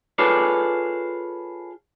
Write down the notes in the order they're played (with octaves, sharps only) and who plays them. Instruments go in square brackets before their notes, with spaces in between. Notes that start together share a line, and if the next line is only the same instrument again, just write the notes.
[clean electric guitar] F4 G#4 A4 B4 C#5 D5